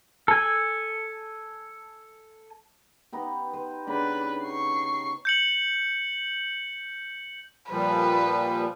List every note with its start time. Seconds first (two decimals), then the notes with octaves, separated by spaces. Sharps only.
0.28 A4 G#5
3.12 B3 D#4 G4
3.53 B4 C5
3.87 C#3 B3 D4 D#4 B4
4.44 C#6 C7
5.25 G6 C#7 F#7
7.71 A#2 F3 G3 B4